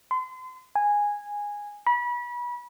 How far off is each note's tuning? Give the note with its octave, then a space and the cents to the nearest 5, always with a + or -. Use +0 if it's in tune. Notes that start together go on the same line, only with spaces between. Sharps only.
C6 -35
G#5 -10
B5 -30